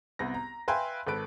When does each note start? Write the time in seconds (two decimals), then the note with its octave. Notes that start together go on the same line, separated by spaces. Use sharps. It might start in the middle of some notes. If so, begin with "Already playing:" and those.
0.19 C2 B3 A#6
0.34 A#5
0.68 B4 E5 F5 G5 G#5 C6
1.07 G#1 A4 B4 D7